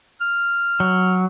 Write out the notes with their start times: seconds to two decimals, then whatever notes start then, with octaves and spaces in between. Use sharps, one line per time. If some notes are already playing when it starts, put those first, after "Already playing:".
0.21 F6
0.80 F#3